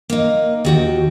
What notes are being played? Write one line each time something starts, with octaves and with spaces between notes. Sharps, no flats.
A#3 D#4
D#2 F#4 G5